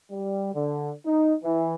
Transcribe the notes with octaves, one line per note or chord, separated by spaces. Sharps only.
G3
D3
D#4
E3